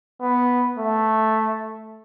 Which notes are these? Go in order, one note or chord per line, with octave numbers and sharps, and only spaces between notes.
B3
A3